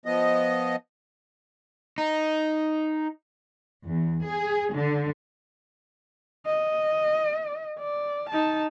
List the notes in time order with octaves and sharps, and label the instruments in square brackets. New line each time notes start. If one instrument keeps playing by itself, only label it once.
[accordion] F3 B3 D#5
[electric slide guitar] D#4
[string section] E2
G#4
D3
[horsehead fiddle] D#5
D5
D#4 A5